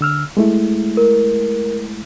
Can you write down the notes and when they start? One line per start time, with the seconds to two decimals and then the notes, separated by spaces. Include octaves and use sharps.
0.01 D3 E6 F6
0.37 G#3 A3 E4
0.97 A#4